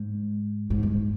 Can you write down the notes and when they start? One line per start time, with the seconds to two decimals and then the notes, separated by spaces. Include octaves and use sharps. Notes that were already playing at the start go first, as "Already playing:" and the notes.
Already playing: G#2
0.70 G#2
0.83 G2